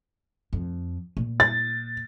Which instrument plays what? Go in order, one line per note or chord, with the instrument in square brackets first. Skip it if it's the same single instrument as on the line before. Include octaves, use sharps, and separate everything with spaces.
[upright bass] F2
A#2
[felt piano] A6